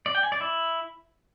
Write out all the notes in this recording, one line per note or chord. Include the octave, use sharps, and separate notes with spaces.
D5
G5
G#5
D5
E4